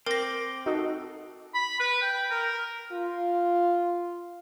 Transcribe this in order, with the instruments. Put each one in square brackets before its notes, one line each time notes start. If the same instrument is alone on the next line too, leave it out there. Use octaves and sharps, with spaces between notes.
[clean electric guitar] C4 [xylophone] A#4 A#6 [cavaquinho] D6
[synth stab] D#4 F#4 A4
[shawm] B5
B4
G5
A#4
[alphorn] F4